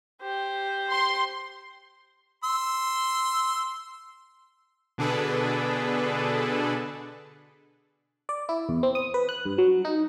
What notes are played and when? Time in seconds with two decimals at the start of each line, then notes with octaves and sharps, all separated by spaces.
0.21 G4 C5
0.91 C6
2.44 C6 E6
4.98 B2 D3 D4 G#4 A4 B4
8.29 D5
8.49 E4
8.69 E2
8.83 C4
8.95 D#6
9.14 B4
9.29 F#6
9.45 G2
9.58 F#3
9.85 D#4